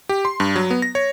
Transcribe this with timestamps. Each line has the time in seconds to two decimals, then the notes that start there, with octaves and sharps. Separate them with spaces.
0.09 G4
0.25 C6
0.40 G2
0.56 F#3
0.70 B3
0.82 A#6
0.95 C#5